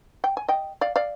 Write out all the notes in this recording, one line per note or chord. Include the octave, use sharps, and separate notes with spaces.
G5
G#5
D#5 G5
D5 F5
D5 F5